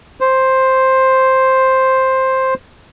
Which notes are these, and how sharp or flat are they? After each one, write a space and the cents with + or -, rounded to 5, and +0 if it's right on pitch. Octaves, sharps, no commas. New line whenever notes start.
C5 +5